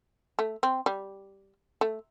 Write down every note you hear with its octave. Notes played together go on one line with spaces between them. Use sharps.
A3
C4
G3
A3